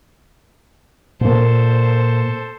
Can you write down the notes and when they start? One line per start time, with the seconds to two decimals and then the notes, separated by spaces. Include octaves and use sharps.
1.21 A#2 A#3 A4 C5